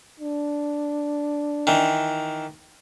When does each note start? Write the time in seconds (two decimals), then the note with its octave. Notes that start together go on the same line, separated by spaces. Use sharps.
0.20 D4
1.67 D#3 E3